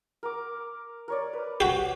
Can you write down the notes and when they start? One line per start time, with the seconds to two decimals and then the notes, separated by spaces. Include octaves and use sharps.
0.23 A#4 D6
1.08 A#4 C#5 D5
1.33 B4
1.60 F#4 G4